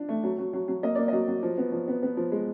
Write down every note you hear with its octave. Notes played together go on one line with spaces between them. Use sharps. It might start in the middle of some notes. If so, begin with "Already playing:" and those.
Already playing: D4 F4
A3
F#3
F#3
F#3
F#3
A#3 D#5
A#3 D5
F#3 D#5
F#3
F3
B3
F3
B3
B3
F3
G#3